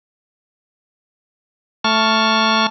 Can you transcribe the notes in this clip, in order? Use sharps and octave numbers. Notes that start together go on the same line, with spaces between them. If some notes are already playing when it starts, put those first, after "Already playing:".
A3 A5 C#6 F6